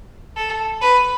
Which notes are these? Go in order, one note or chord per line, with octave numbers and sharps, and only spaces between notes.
A4
B4